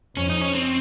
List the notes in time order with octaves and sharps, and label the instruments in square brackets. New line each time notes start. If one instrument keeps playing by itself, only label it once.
[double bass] F2 [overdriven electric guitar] C#4
[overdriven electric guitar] D#4
C#4
C4